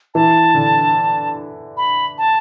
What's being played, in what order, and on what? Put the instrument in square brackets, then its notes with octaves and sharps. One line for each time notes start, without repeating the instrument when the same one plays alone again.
[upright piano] E3 [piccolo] A5
[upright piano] D3
[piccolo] B5
A5